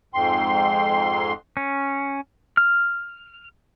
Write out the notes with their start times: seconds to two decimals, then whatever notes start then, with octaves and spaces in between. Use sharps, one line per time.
0.14 F2 G#2 G5 C6
1.57 C#4
2.57 F6